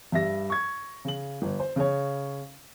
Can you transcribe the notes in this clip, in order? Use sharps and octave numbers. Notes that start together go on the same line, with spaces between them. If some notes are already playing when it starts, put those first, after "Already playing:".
G2 G3 E5 A#6
C#6 G#6
C#3 F#7
G1
C5
C#3 C#5